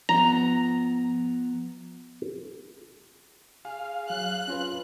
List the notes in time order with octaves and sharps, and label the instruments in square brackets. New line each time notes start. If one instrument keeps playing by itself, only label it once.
[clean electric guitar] F3 B3 [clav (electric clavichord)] A#5
[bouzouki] G#4 [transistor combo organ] F5
[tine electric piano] F#3 [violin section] F#6
[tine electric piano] C#4 F4 B4